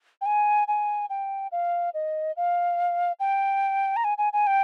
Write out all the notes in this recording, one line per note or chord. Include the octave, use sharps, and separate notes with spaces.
G5
G#5
G#5
G5
F5
D#5
F5
G5
A#5
G#5
G#5
G#5
G5